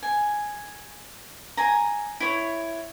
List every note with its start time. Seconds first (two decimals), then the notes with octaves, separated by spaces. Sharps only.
0.03 G#5
1.57 G#5 A#5
2.20 E4 C#5